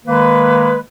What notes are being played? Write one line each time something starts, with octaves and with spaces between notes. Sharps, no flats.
D#3 G#3 A#3 B4